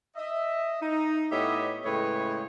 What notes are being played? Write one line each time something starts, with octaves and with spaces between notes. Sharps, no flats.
D#5 E5
D#4
A2 B3 G4 C#5 D#5 E5
A2 C#3 G#3 B4 C#5 G5